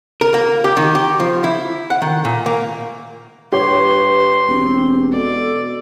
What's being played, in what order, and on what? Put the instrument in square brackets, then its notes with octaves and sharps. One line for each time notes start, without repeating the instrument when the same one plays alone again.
[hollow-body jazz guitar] A#4
A#3
G4
D#3
G4
F3
E4
F#5
D#3
A#2
A#3
[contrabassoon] G2 [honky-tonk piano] G4 C#5 [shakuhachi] B4 [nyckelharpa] C6
[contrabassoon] E1 [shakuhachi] C4
[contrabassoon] B2 [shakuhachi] A4 [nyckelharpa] D5